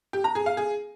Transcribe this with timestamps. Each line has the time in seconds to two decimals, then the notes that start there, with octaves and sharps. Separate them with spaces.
0.13 G4
0.24 A#5
0.35 G#4
0.46 F5
0.57 G#4